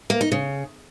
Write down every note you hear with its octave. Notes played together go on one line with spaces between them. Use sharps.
A#3
D#4
C#3